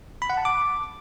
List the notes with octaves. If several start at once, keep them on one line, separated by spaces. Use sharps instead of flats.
B5
F#5
A5
D6